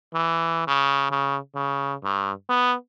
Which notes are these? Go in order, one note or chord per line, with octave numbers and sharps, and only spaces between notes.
E3
C#3
C#3
C#3
G2
B3